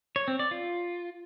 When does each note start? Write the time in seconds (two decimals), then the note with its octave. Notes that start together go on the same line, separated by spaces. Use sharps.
0.16 C#5
0.28 C4
0.39 D5
0.51 F4